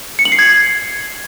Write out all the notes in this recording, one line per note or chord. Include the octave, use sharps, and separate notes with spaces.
C#7
F#7
C7
G#6